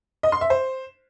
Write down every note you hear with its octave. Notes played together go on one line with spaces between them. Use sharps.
D#5
C6
E5
C5